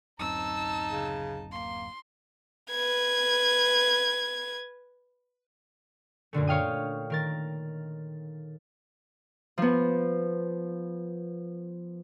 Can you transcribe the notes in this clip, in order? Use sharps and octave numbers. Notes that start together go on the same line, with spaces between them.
D1 F#2 C4 D#4 A5 E6
C#3
A#3 C6
B4 G#6
F#2 A#2 D3 A3
C#5 F5 G5 D#6
D#3 A#4 A6
F3 B3